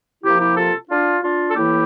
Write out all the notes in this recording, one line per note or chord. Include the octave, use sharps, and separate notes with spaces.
C3 F3 A#3 E4 G4
E4 G4
F4 A4
D4 F4
D4 F4
A4
A2 E3 A#3 E4 G4